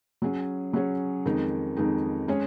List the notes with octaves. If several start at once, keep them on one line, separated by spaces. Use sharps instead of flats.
F#3 C#4 G#4 C#5
F#3 C#4 G#4 C#5
F2 D#3 G#3 D#4
F2 D#3 G#3 D#4
G#3 C#4 G#4 C#5